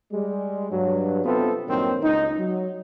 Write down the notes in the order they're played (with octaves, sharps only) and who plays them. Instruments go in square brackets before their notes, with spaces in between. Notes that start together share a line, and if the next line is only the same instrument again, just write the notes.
[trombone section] G3 G#3
G2 F#3
C3 B3 C4 F4 A4
G2 A#2 D#3 F#3 C4
C#2 D#4
F#3